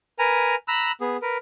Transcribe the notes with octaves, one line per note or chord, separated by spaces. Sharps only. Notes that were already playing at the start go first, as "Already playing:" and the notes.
A#4 B4 G#5 A#5
A#5 B5 E6 F#6
B3 G#4
A#4 B4